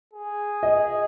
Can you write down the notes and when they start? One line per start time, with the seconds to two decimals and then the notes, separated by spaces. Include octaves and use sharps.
0.13 G#4
0.63 D#5